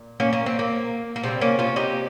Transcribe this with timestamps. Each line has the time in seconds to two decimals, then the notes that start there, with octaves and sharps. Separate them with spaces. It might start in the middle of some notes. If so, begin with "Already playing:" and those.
Already playing: A#2
0.20 A#3 C#4
0.33 A#3 C#4
0.46 C4
0.59 A#3
1.16 A#3
1.23 C3 D#3 G3 C4
1.41 A#3 C#4
1.59 C#4 F4
1.76 D#4 G4